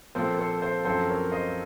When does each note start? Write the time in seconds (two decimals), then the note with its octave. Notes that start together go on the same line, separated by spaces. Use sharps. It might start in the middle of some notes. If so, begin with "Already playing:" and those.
0.15 A#2 F3 C4 A4 C5
0.38 A4 C5
0.62 A4 C5
0.85 F#2 F3 C4 A4 C5
1.09 A#4 C#5
1.32 C5 D#5